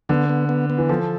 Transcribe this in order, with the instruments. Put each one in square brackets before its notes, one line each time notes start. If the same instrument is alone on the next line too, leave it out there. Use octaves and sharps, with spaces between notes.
[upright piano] D3 [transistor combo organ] B3
[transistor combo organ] B3
B3
B3
[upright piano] E3
[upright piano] F3 [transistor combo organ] A4